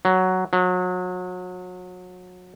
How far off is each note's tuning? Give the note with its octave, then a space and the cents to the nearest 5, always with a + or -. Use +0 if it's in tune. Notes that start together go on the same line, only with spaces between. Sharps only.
F#3 +5
F#3 -30